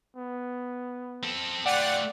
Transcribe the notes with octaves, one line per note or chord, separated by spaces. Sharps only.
B3
C4 A4
A3 F4 D5 F#5 G5